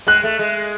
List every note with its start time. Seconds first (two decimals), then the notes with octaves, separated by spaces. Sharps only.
0.07 G#3 F#6
0.24 A3
0.39 G#3